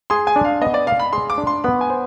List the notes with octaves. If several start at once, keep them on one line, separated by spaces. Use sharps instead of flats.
G#4 C6
G#5
D4
F5
B3 D#5
D5
D5 F5
B5
G#4 C6
D6
D4
C6
B3 B5
G#5
C5